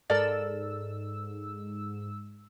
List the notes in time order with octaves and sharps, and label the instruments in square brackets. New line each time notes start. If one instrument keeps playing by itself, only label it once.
[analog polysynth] G#2 E6 [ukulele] A4 A#4 D5